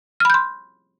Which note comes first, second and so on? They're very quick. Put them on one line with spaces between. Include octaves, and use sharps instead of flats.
F6 B5 G6 C6